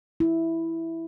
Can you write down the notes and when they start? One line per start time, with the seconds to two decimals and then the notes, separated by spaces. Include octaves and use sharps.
0.20 E4